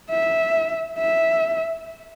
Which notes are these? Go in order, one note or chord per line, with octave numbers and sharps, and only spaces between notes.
E5
E5